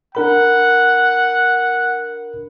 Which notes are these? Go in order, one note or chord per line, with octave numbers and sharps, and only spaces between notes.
D4 A#4 F#5 B5